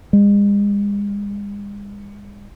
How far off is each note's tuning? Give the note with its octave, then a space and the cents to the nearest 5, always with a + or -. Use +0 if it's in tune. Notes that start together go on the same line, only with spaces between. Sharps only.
G#3 -40